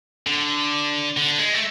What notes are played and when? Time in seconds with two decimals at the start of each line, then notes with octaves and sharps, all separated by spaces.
0.27 D3
1.17 D3
1.39 G#3
1.53 A3